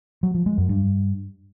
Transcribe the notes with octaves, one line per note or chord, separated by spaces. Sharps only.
F#3
F3
G#3
F#2
G2